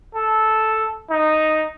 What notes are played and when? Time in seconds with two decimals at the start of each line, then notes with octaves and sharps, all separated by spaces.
0.15 A4
1.10 D#4